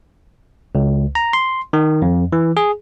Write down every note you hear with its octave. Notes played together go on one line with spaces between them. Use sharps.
C#2
A#5
C6
D#3
F2
E3
G#4